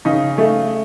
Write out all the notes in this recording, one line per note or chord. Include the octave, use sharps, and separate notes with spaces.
C#3 D#4
A3